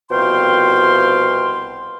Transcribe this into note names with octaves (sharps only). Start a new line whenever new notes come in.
C2 B2 F3 F5 G5 C6